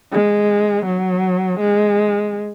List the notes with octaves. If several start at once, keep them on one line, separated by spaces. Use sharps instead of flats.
G#3
F#3
G#3